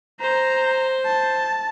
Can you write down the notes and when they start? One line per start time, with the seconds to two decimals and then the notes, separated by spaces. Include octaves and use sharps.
0.21 C5 A#5
1.06 A5